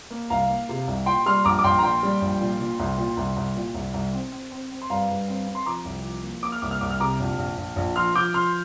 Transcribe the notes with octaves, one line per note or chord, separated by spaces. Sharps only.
A#3
C2 F5 A#5
A#3
C3
C2
A#2 G5 C6
G3 C6 F6
A#1 A#5 D6
D6
A#1 G5 C6
A#5
A#2 G5 C6
G3
A#1
A#2
A#2
C2
A#2
C2
C2
A#2
C2
C2
C4
C4
C4
C4
C6
G2 F5 A#5
G2
C4
C4
C6
F3 A#5 D6
C2
F3
A#3
A#3 D6
F6
C2 D6
F6
C2 D6
F6
C3 A#5 D6
A#1
A#1
A#1
A#1
F3 C6 F6
F3 D6 G6
F3 C6 F6